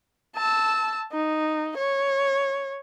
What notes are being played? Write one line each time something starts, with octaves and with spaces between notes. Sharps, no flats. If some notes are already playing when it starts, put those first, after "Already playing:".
A5 E6
D#4
C#5